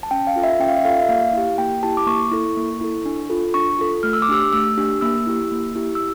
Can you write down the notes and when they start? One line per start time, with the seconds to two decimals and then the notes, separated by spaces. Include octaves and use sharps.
0.03 A5
0.11 C#4 G5
0.27 F5
0.36 F4 A4
0.43 E5
0.60 C#4 G5
0.68 F5
0.77 E5
0.85 F4 A4 F5
1.00 E5
1.09 A#3 F5
1.33 E4 G4
1.58 A#3 G5
1.83 E4 G4 A5
1.97 D6
2.07 A#3 C#6
2.32 E4 A4
2.57 A#3
2.81 E4 A4
3.06 D4
3.30 F4 A4
3.54 D4 C#6
3.79 F4 A4
4.03 A3 F6
4.13 E6
4.22 D6
4.29 D4 G4 E6
4.53 A3 E6
4.77 D4 G4
5.01 A#3 E6
5.27 E4 G4
5.51 A#3
5.75 E4 G4
5.95 E6